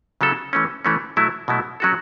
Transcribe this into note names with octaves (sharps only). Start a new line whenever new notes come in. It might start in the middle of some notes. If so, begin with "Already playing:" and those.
C#3 F#3 C#4 E4 A4
E3 A3 C#4
E3 A3 C#4
B2 F#3 A3 E4
B2 F#3 A3 E4
F#3 C#4 F#4 A4